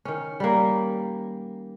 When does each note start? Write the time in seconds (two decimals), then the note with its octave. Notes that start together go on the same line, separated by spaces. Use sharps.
0.05 D#3 C#4
0.40 G3 A#3